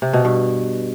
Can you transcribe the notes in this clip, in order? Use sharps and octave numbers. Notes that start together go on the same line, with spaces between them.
C3
B2
G2